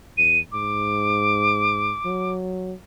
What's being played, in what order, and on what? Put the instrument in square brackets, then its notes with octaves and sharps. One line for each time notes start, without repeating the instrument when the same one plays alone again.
[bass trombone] E2 [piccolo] D#7
[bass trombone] G#2 [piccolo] D6
[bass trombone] F#3